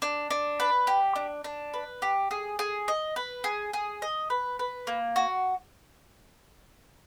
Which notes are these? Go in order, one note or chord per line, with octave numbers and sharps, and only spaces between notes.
D4
D4
B4
G4
D4
D4
B4
G4
G#4
G#4
D#5
B4
G#4
G#4
D#5
B4
B4
A#3
F#4